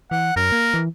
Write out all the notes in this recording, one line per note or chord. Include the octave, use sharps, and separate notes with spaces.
E3 F#5
F#2 A#4
A#3
E3